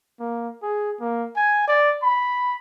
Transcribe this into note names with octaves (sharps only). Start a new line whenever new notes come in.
A#3
G#4
A#3
G#5
D5
B5